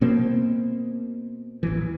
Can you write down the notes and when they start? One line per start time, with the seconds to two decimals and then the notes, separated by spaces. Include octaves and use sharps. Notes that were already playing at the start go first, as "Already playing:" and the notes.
0.01 B2 A#3 C4
1.63 D#1 A1 E3